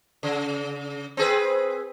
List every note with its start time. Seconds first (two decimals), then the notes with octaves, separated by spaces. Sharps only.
0.23 C#3
1.17 C4 G#4 B4